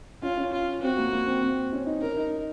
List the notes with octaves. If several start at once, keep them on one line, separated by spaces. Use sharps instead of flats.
C#4 F4
C#4
F4
C4 F#4
A#3
A#3
C4
C4
C#4
D#4
C#4 A#4
D#4